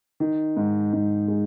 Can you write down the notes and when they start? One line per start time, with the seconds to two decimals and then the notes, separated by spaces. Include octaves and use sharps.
0.20 D#3
0.57 G#2
0.93 G#2
1.28 G#3